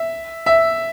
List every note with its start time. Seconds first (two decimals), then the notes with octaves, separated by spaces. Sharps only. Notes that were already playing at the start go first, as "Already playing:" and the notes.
Already playing: E5
0.46 E5